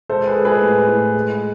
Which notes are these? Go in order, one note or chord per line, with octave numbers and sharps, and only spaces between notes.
G#3 A4 C5
G#4 B4
G#3
G#4 B4
A2
A2
G#3